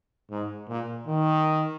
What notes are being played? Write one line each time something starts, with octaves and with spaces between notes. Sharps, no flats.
G#2
A#2
D#3